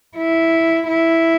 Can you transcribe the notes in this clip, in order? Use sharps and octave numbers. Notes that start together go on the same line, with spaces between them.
E4
E4